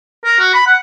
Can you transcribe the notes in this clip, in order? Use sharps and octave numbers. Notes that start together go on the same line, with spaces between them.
A#4
F#4
B5
F#5